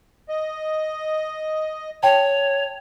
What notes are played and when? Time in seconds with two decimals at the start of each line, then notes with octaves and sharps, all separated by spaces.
0.29 D#5
2.03 C#5 G5 A5